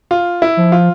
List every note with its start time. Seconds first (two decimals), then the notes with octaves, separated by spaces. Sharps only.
0.11 F4
0.42 E4
0.57 F3
0.72 F4